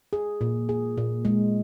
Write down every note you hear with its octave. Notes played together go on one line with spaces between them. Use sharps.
G#4
A#2
G#4
A#2
G#3